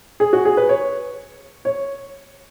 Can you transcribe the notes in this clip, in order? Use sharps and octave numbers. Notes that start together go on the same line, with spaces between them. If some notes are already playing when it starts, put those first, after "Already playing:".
G#4
F#4
G#4
B4
C#5
C#5